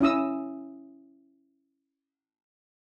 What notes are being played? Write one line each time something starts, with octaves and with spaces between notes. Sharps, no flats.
C#4 E4 D#6 E6